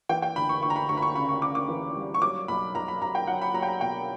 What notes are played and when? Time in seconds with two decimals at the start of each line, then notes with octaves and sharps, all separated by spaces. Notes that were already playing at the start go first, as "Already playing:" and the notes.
0.09 E3 G5
0.22 G5
0.36 D2 B5
0.49 C#6
0.63 D2 C#6
0.70 A#5
0.76 B5
0.89 D2 C#6
0.97 B5
1.02 C#6
1.15 C#3 B5
1.29 C#6
1.42 C#3 D6
1.55 D6
1.69 E3
1.95 G3
2.14 C#6
2.21 F#3 D6
2.48 B1 B5
2.75 B1 A#5
2.88 B5
3.01 B1 A#5
3.15 G5
3.27 F#3 F#5
3.42 B5
3.54 F#3 A#5
3.62 G5
3.68 A#5
3.81 B2 G5